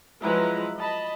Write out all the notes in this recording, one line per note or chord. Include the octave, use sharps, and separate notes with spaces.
F3 F#3 G#3 E4 B4 A#5
D#5 A5 B5